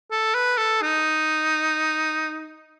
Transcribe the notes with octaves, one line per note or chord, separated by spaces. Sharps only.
A4
B4
A4
D#4